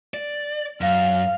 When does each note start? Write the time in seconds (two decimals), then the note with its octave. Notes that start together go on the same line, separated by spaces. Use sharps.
0.14 D5
0.81 F#2 F5